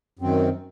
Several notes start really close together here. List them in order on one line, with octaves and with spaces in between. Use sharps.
F#2 C4 D#3